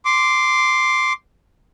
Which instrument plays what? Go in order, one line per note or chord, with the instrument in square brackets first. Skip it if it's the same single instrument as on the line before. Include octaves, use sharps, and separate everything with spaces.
[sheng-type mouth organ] C6 D6